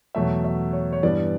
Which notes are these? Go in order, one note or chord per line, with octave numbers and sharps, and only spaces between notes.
E2 B2 F#3 A3 E5
E5
C#5
C#5
G2 E3 G3 B3 D5